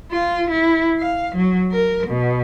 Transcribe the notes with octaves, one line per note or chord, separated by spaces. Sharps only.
F4
E4
F5
F#3
A#4
B2